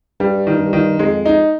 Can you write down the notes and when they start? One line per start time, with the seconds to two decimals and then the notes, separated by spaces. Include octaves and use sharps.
0.20 G2 G3
0.47 D#3
0.59 G2
0.73 D#3
0.99 F2 G#3
1.26 D#4